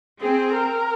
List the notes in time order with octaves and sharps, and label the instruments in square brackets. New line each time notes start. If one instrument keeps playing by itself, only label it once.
[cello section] C4 [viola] G#4
[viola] A#4